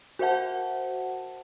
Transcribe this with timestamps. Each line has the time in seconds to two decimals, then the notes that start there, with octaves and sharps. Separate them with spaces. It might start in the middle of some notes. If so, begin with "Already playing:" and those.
0.19 F#4 A#4 C5 E5 F#5 A5